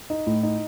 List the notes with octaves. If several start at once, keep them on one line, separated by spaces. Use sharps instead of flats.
D#4
A2
D#4